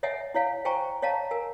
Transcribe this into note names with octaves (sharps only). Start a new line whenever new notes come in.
C#5 D#5 E5 F#5 G#5
E4 C#5 F5 G#5
C5 G5 G#5 A#5 C#6
C#5 D#5 F5 A5 A#5
A#4 G#5